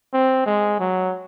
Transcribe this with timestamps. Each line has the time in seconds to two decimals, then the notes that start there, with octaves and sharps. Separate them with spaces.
0.14 C4
0.46 G#3
0.80 F#3